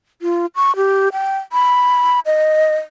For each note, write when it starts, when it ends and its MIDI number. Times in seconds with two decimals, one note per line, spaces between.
0.22 0.46 65
0.56 0.75 85
0.76 1.09 67
1.12 1.37 79
1.52 2.20 83
2.26 2.76 75